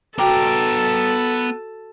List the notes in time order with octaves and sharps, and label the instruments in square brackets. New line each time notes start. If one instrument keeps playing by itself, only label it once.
[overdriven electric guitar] B3 A#5 [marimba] F#4 G5 D6 [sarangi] A4